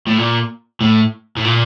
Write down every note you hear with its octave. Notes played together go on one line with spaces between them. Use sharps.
A2
A#2
A2
A2
A#2